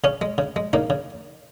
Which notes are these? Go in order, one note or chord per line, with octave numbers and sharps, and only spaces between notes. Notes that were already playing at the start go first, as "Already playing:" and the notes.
C#3 C#4
G#3
C#3
G#3
C#3 A#3 D#4
C#3